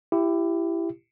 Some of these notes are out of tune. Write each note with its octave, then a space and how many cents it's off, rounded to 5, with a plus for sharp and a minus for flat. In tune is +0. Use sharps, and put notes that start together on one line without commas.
E4 +20 G4 +0